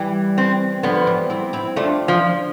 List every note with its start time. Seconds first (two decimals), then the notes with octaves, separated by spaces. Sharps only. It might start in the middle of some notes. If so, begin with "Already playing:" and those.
Already playing: E3 G3
0.38 C4
0.83 D3 F3 B3
1.07 E3 G3
1.30 C4 E4
1.53 C4 E4
1.76 A3 D4 F4
2.08 F3